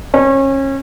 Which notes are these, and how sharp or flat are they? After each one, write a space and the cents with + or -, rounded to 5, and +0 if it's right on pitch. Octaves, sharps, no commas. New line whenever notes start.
C#4 -30